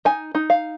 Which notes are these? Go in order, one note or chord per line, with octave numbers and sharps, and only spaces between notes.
D#4 G#5
D#4
F5